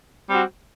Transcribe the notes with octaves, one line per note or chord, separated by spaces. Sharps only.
G3 C4 F#4